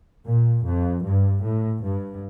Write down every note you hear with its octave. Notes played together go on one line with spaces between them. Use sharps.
A#2
F2
G2
A2
G2